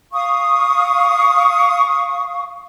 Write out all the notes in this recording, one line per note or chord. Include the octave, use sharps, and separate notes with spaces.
F5 C#6 D#6